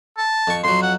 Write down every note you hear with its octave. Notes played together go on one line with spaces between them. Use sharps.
A5
F2 C#6
F2 F#3 C6
F#5